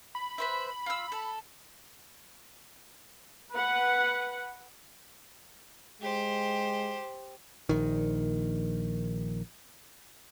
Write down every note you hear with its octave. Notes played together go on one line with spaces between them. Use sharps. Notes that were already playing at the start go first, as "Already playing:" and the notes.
B5
B4 C5 E5
F4 E6
A4
B4 F#5
G#3 G4 C5
A#1 D#3